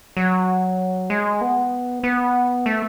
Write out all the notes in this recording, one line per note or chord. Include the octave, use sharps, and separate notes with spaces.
F#3
G#3
B3
B3
A3